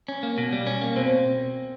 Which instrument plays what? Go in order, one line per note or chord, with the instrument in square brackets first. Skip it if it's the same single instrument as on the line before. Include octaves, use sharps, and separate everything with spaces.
[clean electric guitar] C#4
A#3
B2
G3
C#4
A#3
[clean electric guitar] B2 [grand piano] C4